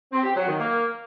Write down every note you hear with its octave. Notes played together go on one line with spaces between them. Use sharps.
C4
G4
F#3
D#3
A#3